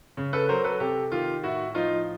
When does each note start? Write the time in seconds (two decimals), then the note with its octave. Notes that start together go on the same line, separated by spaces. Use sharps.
0.17 C#3
0.33 A4 B4
0.48 F#3 A#4 C5
0.64 A4 B4
0.80 C3 G4 A4
1.12 D#3 F4 G4
1.43 A2 E4 F#4
1.75 F3 D#4 F4